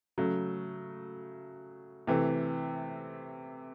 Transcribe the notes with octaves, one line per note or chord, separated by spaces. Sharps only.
C#3 F#3 A3
C3 E3 A3